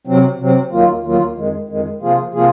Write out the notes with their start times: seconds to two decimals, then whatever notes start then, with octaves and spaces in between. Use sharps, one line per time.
0.07 C3 F#3 C4
0.39 C3 F#3 C4
0.72 D#2 D#3 F#3 A#3 F4
1.04 D#2 D#3 F#3 A#3 F4
1.37 F2 D#3 G#3
1.69 F2 D#3 G#3
2.02 C3 F3 A#3 F4 G#4
2.34 C3 F3 A#3 F4 G#4